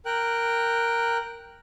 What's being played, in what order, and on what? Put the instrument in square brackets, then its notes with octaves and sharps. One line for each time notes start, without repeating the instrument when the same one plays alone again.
[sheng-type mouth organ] A#4 G5 F#6